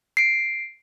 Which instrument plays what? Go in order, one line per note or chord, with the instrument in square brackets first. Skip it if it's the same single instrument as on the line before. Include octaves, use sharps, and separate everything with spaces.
[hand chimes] C7 D7